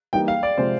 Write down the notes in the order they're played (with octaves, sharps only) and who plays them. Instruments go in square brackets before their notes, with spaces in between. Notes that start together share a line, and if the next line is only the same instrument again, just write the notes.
[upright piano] E3 G3 A#3 D#4 [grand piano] G5
[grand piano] F5
D5
[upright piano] C3 F3 G#3 [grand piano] C5